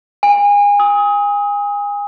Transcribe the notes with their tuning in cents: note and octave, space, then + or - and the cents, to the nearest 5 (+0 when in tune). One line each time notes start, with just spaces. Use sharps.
G#5 -30
D#6 +30